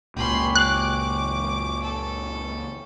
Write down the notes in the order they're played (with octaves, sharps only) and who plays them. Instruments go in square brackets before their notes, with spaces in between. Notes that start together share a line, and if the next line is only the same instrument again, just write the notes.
[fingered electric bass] F#1 C#2 A#2 [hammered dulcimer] C#4 G4 [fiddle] B5 C6
[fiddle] D6 [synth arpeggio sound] F#6
[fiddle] A4